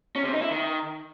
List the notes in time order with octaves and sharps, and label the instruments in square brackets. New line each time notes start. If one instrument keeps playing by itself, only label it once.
[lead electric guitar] C#4
C3
D#4
E4
D#3